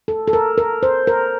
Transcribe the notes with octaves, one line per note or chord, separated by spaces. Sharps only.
A4
A4
A#4
A#4
C5
A#4